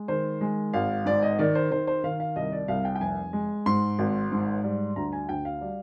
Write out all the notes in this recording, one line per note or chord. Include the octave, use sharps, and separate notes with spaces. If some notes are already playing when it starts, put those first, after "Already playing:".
Already playing: G#3
D#3 C5
G#3
G#1 F5
G#2 D5
D#5
D#3 D5
C5
D#3 C5
C5
D#3 F5
F5
C2 D#5
D5
C2 F5
G5
G5
F1 G#5
G#3
G#2 C6
G#1
G#2
G3
D2 A#5
G#5
D2 G5
F5
G3